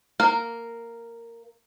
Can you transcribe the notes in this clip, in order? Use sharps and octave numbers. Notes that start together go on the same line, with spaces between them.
A#3 A#4